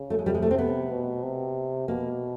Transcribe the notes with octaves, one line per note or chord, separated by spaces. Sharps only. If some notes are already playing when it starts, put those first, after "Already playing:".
Already playing: C#3
A3
G#3
C3 G3
G#3
A3
C4
B3
B2
C3
B2 A#3